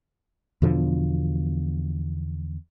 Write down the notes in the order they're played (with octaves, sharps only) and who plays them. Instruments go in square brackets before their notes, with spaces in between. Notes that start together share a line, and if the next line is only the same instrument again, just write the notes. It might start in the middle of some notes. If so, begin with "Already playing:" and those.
[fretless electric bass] E2 B2 D3 F3